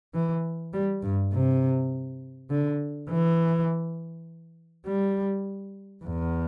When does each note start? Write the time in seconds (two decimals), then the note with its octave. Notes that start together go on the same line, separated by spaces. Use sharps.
0.14 E3
0.73 G3
1.03 G2
1.32 C3
2.50 D3
3.09 E3
4.86 G3
6.05 E2